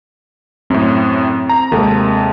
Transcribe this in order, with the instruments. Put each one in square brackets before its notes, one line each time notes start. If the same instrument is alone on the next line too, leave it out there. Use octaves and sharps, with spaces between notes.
[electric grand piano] F#2 A2 [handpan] C4
[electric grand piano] A#5
[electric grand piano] D#2 C3 G#3 [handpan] A4 A#4